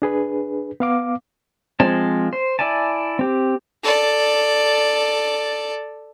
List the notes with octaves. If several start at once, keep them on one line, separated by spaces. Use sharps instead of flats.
D4 G#4 B4
B3 F5 D6
F3 G#3 C4 A5
C5
E4 D5 G#5 A5
C4 G4
A4 D5